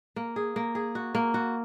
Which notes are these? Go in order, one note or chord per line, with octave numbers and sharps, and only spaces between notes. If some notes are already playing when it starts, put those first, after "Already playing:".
A#3
G#4
A#3
G#4
F#4
A#3
F#4